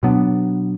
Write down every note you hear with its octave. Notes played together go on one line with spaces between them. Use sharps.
B2 F#3 B3 D4